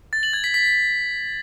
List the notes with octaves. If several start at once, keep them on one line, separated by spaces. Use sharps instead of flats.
A6
F#7
G#6
B6
B6